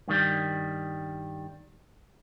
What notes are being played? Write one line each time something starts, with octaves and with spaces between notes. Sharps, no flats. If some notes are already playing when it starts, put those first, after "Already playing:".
G2 D#3 G3